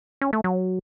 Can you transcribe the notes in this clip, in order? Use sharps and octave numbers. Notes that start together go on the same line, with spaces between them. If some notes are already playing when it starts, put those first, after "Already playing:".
C#4
A3
F#3